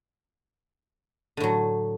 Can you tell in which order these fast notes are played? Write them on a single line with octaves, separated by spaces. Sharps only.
D3 A2 F#3